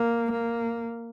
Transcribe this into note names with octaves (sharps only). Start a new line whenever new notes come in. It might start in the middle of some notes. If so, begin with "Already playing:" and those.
Already playing: A#3
A#3